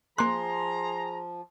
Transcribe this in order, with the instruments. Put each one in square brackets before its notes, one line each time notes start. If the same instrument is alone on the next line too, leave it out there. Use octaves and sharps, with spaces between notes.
[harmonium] F3 [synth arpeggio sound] A#3 F#6 [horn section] G#4 A#5 [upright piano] C6